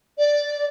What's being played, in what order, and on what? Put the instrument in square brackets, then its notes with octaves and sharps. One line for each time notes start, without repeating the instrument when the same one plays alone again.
[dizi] D5